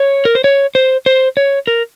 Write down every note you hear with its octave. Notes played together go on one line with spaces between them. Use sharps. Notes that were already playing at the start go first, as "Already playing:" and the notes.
Already playing: C#5
A#4
C5
C#5
C5
C5
C#5
A#4